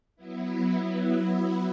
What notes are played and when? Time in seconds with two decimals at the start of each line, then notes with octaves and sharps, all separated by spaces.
0.16 F#3 B3 E4